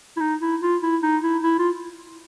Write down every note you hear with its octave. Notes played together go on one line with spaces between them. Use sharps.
E4
D#4
E4
F4
E4
D#4
E4
E4
F4